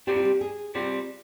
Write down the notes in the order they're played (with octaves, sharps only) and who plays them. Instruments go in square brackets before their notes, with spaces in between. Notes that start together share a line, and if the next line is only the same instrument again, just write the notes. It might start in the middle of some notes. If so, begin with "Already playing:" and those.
[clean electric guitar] C3 G3 C4 [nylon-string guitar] G4
[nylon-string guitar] F4
G4
G#4
[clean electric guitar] C3 G3 C4 [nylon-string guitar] F4